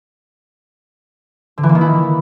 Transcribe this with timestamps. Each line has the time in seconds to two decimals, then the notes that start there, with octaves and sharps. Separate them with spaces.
1.58 D3
1.63 E3
1.69 A#3
1.75 D#3
1.81 E4